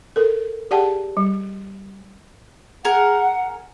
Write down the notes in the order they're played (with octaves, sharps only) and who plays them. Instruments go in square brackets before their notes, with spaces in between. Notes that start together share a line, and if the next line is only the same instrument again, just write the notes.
[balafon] A4 A#4
G4 G#4 D5 F#5 G5 A5
G3
[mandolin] G#4 A#4 [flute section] F#5